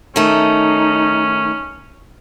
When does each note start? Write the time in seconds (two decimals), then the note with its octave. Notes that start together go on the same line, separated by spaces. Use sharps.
0.16 D#3 A3 C#4 D#4